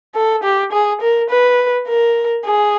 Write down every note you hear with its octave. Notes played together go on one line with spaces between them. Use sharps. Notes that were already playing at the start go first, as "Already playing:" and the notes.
A4
G4
G#4
A#4
B4
A#4
G#4